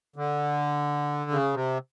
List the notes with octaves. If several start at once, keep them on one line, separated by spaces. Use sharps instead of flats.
D3
C#3
C3